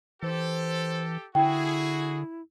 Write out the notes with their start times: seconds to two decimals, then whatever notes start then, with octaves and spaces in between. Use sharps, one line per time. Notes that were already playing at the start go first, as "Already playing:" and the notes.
0.23 E3 G4 A4 C5
1.35 D3 E4 F#4 G#4 G5